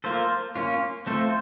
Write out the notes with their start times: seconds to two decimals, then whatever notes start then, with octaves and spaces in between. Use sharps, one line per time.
0.04 A#3 F4 A4 C5
0.56 A#3 C#4 F4
1.07 A3 C4 F4 A4 C5